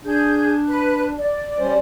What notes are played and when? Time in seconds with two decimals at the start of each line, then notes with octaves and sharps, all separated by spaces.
0.05 D4 G#4 G6
0.67 B4 F#6
1.18 D5
1.58 G3 C#4 C5